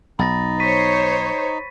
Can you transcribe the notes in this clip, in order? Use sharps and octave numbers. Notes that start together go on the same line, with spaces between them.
B1 D#4 B5 A6 A#6
C5 C#5 C#6 B6 D#7